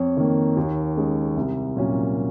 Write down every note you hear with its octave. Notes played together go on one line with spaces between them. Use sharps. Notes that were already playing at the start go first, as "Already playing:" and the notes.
Already playing: F2 C#5
D#3 A#3
D#2
C#3 G#3
C2
A#2 F#3 C#4